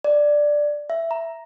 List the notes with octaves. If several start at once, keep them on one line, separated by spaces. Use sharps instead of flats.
D5
E5
A#5